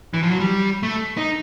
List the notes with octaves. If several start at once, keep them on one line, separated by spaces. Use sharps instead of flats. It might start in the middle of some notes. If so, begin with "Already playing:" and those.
E3
F3
F#3
G3
A3
D#4